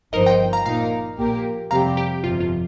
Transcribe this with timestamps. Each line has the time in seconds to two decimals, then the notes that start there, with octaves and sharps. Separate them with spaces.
0.13 G1 G2 F3 D#4 A#4 C5 D#5
0.26 D#5 G5
0.53 F5 A#5
0.65 A#2 A#3 D#4 A#4 F5 A#5
1.18 A#1 A#2 A#3 G4 A#4
1.71 F2 C3 G3 C4 G4 F5 A#5
1.97 G4
2.24 G1 F2 C3 F3 F4
2.41 F4